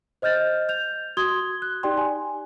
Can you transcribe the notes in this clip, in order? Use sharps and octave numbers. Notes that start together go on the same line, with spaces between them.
C5 D#5 F6 G6 A6
G6 F7
F#4 C6 D#6 G#6 G7
F#6
D#4 G4 D5 G5 C6
G#5